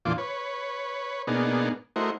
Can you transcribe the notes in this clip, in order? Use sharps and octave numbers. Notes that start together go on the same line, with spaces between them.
E2 A#2 D3 F3 F4 D6
B4 C#5
B2 A#3 B3 D4 D#4 G#4
A3 E4 F#4 A#4 C5 D#5